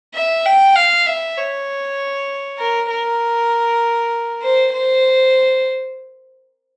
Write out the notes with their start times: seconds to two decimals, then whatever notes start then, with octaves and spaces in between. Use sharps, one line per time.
0.15 E5
0.46 G5
0.76 F5
1.06 E5
1.37 C#5
2.59 A#4
2.90 A#4
4.42 C5
4.73 C5